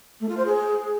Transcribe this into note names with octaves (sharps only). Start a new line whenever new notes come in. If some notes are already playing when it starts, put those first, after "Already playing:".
A3
F4
C5
G#4